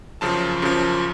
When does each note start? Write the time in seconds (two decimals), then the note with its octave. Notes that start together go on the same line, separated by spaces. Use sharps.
0.21 F#2 C#3 F3 A5
0.62 F#2 C#3 F3